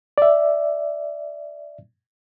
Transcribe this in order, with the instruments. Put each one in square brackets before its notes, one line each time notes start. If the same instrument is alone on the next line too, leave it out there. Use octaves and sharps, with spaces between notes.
[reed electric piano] D5 E5